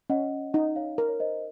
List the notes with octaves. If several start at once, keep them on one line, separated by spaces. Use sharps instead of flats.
C#4 D#5 F#5
D#4 D#5 F#5
C#5 F5
A#4
C#5
C5 D#5